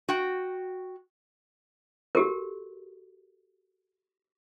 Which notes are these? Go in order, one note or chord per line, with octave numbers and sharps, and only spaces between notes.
F#4 G5
F#4 G4 A4 A#4